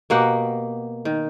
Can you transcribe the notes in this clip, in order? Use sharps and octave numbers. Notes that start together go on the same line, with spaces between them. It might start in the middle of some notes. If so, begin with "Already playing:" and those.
B2 A#3 G4 F#5
D#3